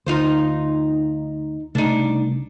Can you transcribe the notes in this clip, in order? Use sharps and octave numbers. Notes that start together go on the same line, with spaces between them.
D2 D#4 F4 C5
C2 C#3 A3 D4 D#4